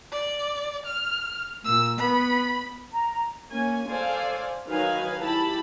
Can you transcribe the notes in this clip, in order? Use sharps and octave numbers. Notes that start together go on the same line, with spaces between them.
D5
F6
A#2 E6
B3 B5
A#5
A#3 C#4 G#5
A4 C5 D5 F5 G#5
D#3 F#3 D#4 B4 F5 G#5
E4 G4 A5 B5